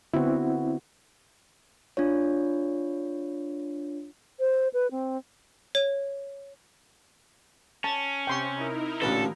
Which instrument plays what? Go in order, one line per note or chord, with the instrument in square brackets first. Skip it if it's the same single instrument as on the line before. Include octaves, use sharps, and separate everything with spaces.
[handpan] D3 B3 F#4 [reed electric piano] C4 E4
[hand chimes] D4 F4 C#5
[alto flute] C5
B4
C4
[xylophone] C#5
[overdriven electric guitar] C#4 [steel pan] A5
[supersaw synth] C3 C4 [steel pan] G5 C6 C#6
[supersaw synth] D#4 E4 A#4
[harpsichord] A1 A#2 D3 [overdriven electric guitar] A4 [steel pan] B4